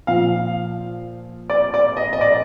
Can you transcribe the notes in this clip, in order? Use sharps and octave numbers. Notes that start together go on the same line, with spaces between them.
A#2 F3 F5
D5
D5
D#5
D#5
D5